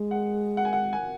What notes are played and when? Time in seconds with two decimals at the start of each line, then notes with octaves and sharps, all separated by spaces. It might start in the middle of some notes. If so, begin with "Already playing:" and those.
Already playing: G#3
0.11 F#5
0.57 F#5
0.65 G#5
0.73 F#5
0.93 G#5